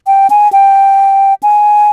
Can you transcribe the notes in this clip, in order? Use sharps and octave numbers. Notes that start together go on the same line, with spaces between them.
G5
G#5
G5
G#5